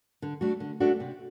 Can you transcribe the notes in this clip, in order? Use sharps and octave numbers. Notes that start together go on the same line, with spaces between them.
D3
A3 D4 F#4
D3
A3 D4 F#4
C3